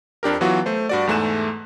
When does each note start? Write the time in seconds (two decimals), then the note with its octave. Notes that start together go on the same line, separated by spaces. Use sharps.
0.23 F2 D4 G4 A#4
0.41 E3 F#3 B3 F4 F#4
0.66 A3 C5
0.89 G2 F#4 D5
1.07 E2 G#2 A3 G#5 F#6 E7